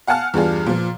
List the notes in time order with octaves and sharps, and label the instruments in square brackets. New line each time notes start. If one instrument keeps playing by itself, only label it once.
[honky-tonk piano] F5 F#5 G#5 A5 F6
E2 G2 D4 F4 G#4
A#2 F3